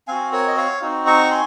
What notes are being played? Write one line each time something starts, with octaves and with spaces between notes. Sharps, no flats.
C4 F#4 F5 G#5
A#4 C#5
D#5
C#5 F5
C4 D#4 F#4
A#5 C#6
G#5 C6